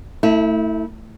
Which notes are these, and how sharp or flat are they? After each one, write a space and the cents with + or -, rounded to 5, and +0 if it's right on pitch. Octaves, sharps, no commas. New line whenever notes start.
A3 +20 E4 -25